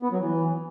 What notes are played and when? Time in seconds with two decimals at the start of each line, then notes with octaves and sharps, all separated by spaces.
0.03 B3
0.12 F#3
0.21 E3